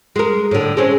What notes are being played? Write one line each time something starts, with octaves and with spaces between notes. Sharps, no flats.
G#3 A#4
A2 D3
G#3 C4 C#4